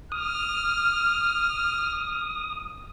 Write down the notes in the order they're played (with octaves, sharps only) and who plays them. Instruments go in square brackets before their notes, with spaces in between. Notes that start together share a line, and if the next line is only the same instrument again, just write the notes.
[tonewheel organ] D#6 [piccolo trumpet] F6